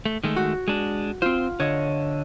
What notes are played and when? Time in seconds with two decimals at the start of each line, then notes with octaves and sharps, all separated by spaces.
0.05 A3
0.23 D#3 G#3 A3
0.36 F#4
0.68 G#3 D4
1.22 C4 F4 C5
1.60 D3 C#5 D#5